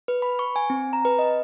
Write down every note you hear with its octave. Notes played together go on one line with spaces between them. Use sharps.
B4
B5
C#6
G#5
C4
A#5
B4
D#5